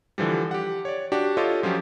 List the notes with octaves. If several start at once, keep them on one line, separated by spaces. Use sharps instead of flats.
D3 E3 F3 G3
G4 F#5
C#5 D5
D4 F#4 G4
F4 G4 A4 C#5 D#5
F3 F#3 C#4 G4